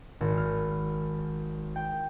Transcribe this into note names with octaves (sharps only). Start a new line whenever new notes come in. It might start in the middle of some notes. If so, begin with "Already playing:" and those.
G#1
F6
G5